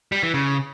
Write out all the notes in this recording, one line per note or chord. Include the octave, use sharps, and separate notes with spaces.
G3
E3
C#3